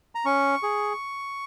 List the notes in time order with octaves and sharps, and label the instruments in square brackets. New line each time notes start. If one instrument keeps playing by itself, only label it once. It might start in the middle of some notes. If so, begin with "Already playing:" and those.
[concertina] A#5
C#4 C#6
G#4